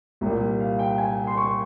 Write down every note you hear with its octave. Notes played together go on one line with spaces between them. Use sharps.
C2 A#2 G3
F5
G5
G#5
C6
C#6